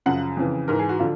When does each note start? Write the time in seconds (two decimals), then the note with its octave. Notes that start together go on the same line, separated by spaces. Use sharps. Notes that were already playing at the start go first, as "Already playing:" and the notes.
0.06 F#2 C#3 F3 F#5
0.37 F2 C#3 E3
0.68 G#2 E3 A#4
0.79 G#4
0.89 F#4
0.99 D3 F3 F4